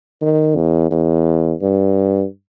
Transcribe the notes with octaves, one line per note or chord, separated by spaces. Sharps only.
D#3
E2
E2
G2